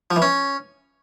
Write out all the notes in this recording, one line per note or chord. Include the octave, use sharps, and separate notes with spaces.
F3
E3
C#4